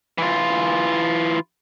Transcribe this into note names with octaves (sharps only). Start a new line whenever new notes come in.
E3 F4